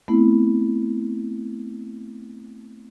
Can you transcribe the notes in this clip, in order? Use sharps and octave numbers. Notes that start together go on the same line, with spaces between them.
A3 B3 C4 E4